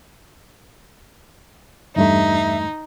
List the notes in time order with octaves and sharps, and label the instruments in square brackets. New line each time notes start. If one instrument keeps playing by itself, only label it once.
[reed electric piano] E2 G2 A3 [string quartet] D#4 [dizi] E5